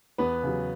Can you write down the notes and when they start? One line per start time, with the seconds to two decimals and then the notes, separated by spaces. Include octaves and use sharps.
0.18 E2 B3 B4
0.43 C#3 F#3